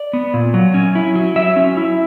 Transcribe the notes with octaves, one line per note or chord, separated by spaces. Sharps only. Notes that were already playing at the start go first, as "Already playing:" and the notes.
Already playing: D5
B3
A#2
F#3
C#4
E4
F#3
F#3 E5
C#4
E4